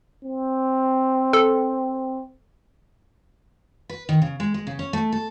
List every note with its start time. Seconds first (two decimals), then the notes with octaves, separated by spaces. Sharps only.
0.24 C4
1.33 A4
3.89 B4
4.09 D#3
4.22 C#3
4.40 G#3
4.54 G#3
4.67 C#3
4.79 C#4
4.93 A3
5.12 A4